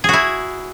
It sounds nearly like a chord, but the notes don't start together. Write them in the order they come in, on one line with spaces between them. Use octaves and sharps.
G#4 F#4 E4